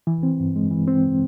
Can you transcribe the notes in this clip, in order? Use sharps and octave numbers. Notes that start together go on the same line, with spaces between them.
E3
C4
G2
G#3
E3
C4